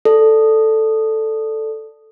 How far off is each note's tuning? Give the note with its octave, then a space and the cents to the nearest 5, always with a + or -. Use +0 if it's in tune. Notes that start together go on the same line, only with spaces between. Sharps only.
A4 +0 D5 +0